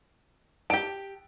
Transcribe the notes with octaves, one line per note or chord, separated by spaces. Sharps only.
G4 A5 D7